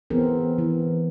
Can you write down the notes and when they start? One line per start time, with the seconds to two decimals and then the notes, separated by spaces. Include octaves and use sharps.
0.10 E3 B3 C4 G#4 A#4
0.58 E3